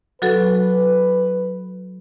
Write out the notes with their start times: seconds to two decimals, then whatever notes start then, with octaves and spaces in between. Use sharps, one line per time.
0.22 F#3 F#4 A4 B4